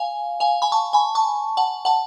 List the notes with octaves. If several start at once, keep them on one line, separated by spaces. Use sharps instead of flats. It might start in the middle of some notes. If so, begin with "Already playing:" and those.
Already playing: F5 G#5
F5 G#5
G#5 B5
A5 C#6
G#5 B5
A5 C#6
F#5 A5
F#5 A5